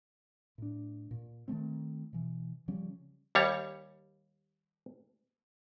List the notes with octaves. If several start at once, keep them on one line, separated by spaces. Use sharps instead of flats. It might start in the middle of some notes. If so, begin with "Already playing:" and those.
A2 D4
A#2
D#3 F#3 A3 C4
B2 E3
C#3 F3 G3 C#4
D#2 G3 C#5